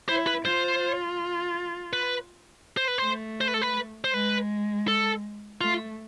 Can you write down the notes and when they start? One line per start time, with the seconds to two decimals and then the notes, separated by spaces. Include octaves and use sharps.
0.09 E4 C5
0.27 B4
0.45 F4 C5
1.93 B4
2.77 C5
2.88 B4
2.98 C5
3.03 A3
3.41 C5
3.48 B4
3.54 A4
3.62 B4
4.04 C5
4.14 G#3 B4
4.88 A4
5.61 A3 F4